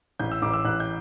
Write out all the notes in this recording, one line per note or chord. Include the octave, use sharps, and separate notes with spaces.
A1 G6
E6
A1 D6
E6
A1 F#6
G6